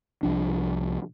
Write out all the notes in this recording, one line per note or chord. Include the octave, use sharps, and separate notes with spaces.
C2 F3 D4